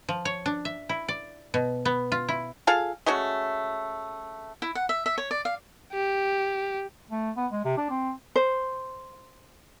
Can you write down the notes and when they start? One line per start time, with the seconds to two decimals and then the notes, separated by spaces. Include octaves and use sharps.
0.09 F3
0.25 C#5
0.46 D4
0.65 E5
0.89 E4
1.08 D5
1.54 B2
1.85 B3
2.12 F4
2.28 E4
2.67 F4 G#4 A4 F5
3.06 G#3 A3 C#4 F#4
4.62 E4
4.75 F#5
4.89 E5
5.06 E5
5.18 C#5
5.31 D5
5.45 F5
5.92 G4
7.11 A3
7.37 B3
7.52 G#3
7.65 C3
7.78 D4
7.90 C4
8.36 C5